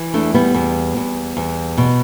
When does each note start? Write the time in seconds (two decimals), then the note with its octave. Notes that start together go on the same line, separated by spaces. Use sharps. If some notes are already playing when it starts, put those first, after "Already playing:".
Already playing: E3
0.14 E2 A3 D4
0.34 G3 B3
0.54 E2
0.97 E2
1.37 E2
1.77 B2